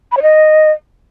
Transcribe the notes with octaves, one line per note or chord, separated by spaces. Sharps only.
B5
C#5
D#5